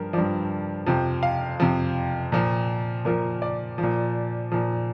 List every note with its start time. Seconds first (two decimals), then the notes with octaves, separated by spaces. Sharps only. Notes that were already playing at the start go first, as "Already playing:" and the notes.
Already playing: G2 F3 A#4
0.13 G2 F3 D5
0.86 F2 C3 F3
1.23 F5
1.60 F2 C3 F3
2.32 A#2 F3
3.05 A#2 F3 A#4
3.42 D5
3.78 F3
3.83 A#2
4.52 A#2 F3